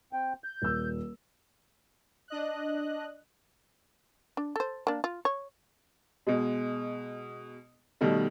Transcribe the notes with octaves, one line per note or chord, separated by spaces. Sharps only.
C4 G5
G6
D#1 E6
D4 D#5 F#6
D4
A4 C5
A#3 D4
F4
C#5
B2 G#3
B2 D#3 G3 A3